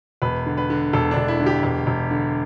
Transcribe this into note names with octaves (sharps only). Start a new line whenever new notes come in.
E1 B4
D3
B4
D3
E1 A4
D4
E1
E4
D3
G4
E1
E1
D3